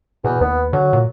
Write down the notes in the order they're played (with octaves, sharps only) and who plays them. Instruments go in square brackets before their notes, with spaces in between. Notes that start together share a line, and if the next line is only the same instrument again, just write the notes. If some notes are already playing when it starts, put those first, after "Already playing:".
[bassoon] E2 [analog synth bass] B2
[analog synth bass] D#2 [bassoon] B3
[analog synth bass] D3 [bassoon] F#3
[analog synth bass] A#2